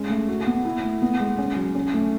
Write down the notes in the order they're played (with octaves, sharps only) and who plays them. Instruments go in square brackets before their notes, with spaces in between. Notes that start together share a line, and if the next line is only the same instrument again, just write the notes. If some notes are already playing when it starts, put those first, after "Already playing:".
Already playing: [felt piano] G#3 C#4
A3
F#4
B3
E4
A3
B3
G#3
C#4
F#3
C#4
A3